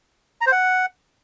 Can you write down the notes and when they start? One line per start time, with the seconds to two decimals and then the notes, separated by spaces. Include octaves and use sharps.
0.41 A#5
0.47 C5
0.52 F#5